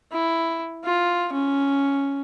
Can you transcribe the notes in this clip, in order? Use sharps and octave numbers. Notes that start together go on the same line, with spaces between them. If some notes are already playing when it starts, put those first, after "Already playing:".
E4
F4
C#4